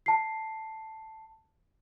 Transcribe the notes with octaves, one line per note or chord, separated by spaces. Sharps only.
A5 C7